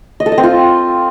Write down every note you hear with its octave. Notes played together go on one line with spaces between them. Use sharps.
D#5
A4
D#5
C4
F4